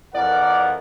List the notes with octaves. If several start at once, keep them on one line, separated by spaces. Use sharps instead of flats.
F2 E3 A#4 D5 F#5